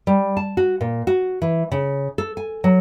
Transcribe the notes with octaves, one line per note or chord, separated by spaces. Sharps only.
G3
A5
F#4
A#2
F#4
E3
C#3
A4
G#5
F#3